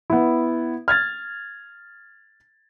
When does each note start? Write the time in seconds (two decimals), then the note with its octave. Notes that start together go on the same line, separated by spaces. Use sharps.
0.10 B3 E4
0.88 F6 G#6 A6